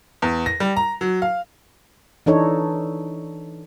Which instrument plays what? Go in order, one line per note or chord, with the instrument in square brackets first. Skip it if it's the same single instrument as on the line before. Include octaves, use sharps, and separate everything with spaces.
[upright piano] E2
A#6
G3
A#5
F#3
F5
[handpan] E3 D4 D#4 A4 C#5